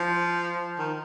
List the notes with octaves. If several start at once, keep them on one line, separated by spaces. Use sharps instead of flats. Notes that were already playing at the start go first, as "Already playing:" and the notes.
Already playing: F3
D#3